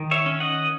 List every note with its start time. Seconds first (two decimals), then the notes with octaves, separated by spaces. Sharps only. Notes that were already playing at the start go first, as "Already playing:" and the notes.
Already playing: D#3
0.11 C#5 E5
0.26 C#4
0.40 D#5 F#5